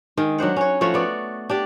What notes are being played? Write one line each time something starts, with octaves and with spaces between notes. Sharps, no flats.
D#3 G#3
F#3 D4 C5 F#5
C#4 C#5
F3 A3 F#4 C#5
B3 D5
D4 G4 D5